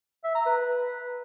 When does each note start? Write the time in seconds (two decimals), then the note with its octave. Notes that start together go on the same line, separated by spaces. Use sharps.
0.24 E5
0.35 A#5
0.46 B4